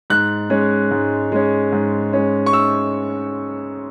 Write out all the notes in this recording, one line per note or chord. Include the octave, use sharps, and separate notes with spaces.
G#2 F#6
G#3 C#4
G#2
G#3 C#4
G#2
G#3 C#4
C#6
E6